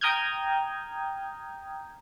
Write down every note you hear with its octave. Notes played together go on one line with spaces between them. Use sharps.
G5 A#5 D#6 F6 G6 G#6